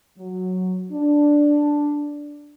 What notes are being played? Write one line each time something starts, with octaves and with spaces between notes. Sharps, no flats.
F#3
D4